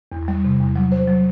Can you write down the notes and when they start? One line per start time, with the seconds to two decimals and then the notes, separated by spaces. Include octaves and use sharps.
0.12 E2
0.28 G3
0.45 C3
0.60 E2
0.76 F#3
0.92 C5
1.08 F#3